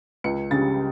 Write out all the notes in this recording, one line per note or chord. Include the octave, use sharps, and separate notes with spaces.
C#2 C#7
C#3 G3 A6